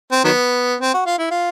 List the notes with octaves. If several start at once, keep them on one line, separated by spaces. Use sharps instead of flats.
C4
D#3 F#3 B3
C4
F#4
F4
E4
F4